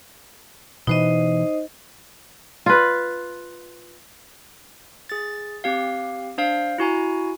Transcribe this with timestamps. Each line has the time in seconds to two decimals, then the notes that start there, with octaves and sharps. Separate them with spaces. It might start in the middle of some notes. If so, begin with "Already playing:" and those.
0.87 B2 E3 D#4 C5 D#5
2.66 F4 B4
5.09 G#4 A6
5.64 C4 G4 F5
6.38 D4 C5 F5
6.78 E4 F#4 G#5 A#5